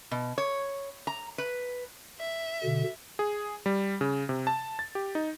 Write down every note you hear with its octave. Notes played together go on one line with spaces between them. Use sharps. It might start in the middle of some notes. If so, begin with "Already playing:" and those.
B2
C#5
A#5
B4
E5
B2 D3
G#4
G3
C#3
C3
A5
A6
G4
D#4